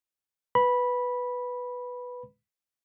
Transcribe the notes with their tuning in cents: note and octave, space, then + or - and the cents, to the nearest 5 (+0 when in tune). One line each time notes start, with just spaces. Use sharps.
B4 +0 B5 -10